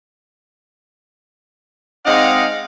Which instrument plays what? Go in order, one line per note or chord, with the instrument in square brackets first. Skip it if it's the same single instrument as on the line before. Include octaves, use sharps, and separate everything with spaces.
[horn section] G#3 C4 D#4 D5 F5 F#5